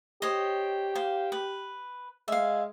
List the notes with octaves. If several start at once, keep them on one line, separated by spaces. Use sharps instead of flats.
G4 C5 C#5 D#5
C5 F5
B4
G#3 E5 F5